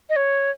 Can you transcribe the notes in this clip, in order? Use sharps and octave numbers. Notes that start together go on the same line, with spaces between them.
D#5
C#5